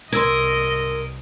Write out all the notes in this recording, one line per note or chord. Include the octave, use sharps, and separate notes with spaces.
C2 A#4 D#5 C6 E6 G#6